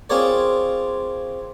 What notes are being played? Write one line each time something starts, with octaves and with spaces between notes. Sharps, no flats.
C4 F4 G#4 A#4 C#5 D5